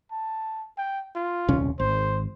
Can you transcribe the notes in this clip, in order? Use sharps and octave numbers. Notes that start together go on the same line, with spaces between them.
A5
G5
F4
D#1 C2 C#4
G#1 C5